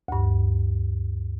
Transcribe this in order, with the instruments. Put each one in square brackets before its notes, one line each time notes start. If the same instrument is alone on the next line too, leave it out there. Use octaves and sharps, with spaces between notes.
[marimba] D2 G2